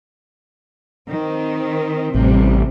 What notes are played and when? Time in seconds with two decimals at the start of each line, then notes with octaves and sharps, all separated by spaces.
1.10 D#3 C4
2.15 A1 C3 G3